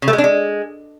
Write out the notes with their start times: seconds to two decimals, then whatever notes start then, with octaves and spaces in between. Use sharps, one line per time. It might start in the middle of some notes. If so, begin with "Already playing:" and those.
0.02 C#3
0.08 A3
0.13 G#3
0.18 D4
0.24 G#3